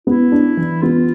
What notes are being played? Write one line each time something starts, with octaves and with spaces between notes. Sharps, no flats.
B3 E4
D4
E3
B3 F4